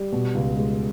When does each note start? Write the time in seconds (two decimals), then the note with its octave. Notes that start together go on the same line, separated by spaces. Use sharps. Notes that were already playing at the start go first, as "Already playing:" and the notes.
Already playing: G3
0.12 B2
0.35 C#2
0.56 G#3